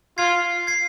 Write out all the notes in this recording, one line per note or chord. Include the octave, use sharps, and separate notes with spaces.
F4 G#6 C7
G#6 C7